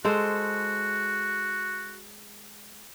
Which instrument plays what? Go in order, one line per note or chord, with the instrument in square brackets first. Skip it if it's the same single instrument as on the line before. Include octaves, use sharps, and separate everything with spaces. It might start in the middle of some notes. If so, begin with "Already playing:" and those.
[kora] G#3 A4 C5 [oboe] F#4